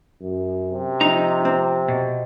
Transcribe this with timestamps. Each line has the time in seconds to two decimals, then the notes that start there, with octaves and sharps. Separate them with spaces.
0.21 F#2
0.68 C3
1.01 F3 D#4 A#5
1.45 C4
1.88 B2